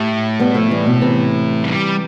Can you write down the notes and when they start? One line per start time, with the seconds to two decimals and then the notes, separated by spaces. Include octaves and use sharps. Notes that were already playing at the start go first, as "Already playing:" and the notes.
Already playing: A2 E4 G4
0.40 G3 B3
0.54 F3 A3
0.71 E3 G3
0.86 B2
1.02 C3 E3
1.64 G3